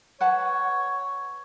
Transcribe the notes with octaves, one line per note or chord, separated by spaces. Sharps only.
B4 C#5 F#5 A5